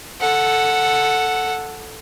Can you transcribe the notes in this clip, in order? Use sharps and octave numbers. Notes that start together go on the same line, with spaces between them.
A4 F#5